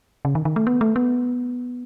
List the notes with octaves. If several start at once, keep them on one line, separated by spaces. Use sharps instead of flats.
C#3
D#3
D#3
A3
B3
A3
B3